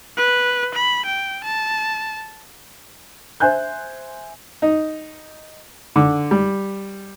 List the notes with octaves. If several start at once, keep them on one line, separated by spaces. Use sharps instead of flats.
B4
B5
G5
A5
C5 E5 G#5 F#6 G6
D#4
D3
G3